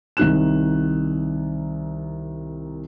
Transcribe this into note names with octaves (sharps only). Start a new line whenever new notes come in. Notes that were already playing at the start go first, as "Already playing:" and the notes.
C2 D#3 F#6 E7